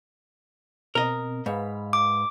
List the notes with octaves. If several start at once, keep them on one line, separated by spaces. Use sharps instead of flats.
B2 C4 A#4 D#5
G#2 B4 F5 B5
D6